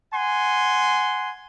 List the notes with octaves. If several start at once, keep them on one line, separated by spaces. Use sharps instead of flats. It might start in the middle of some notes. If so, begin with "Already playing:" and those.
F#5 G#5 C6